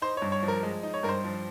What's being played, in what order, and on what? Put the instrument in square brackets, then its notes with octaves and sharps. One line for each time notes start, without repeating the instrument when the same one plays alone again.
[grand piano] D#4 C5
G2 C#5
C#5
F3
A#4
G#3
D#4
C#5
G2 A#4
C5
F3